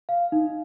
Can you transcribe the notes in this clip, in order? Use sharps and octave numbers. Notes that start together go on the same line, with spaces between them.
F5
D#4